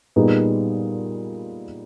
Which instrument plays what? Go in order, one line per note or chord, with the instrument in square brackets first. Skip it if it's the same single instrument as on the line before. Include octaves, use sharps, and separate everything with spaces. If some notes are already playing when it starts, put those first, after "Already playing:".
[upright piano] A#2 G3 B3 D#4 G#4